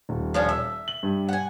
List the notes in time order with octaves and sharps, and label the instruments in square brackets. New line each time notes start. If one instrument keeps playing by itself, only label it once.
[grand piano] D#1
[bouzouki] F3 C#4 D4
[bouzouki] E5 [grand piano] E6
[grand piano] F#7
G2
[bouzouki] F#5 G#5